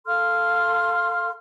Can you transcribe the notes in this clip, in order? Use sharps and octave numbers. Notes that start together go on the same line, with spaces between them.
A4 F5 C6 F6